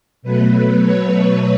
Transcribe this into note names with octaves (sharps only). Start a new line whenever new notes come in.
B2 F#3 A3 B4
C#5